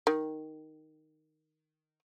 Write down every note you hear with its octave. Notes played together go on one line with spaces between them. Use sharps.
D#3